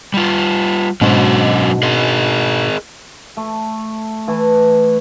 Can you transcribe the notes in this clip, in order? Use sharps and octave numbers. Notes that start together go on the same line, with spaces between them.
G3 F4
G#2 B2 F#3 C#4 D4 D#5
G#4 A#4 D#5
A3
E3 A3